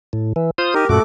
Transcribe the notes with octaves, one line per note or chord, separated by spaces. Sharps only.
A2
E3
F4 C5 D#6
D#4 G4 A#4
F#2 A#2 A3 F#4 D6